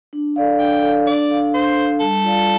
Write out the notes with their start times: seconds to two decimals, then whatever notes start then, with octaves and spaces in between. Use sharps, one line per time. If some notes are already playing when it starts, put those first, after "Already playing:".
0.13 D4
0.36 A4 D5 F5
0.59 D4 G5
0.82 A4 D5 F5
1.06 D4 D5
1.30 A4 F5
1.53 D4 C5
1.76 A4 F5
2.00 G3 A4
2.24 F4 D5 F5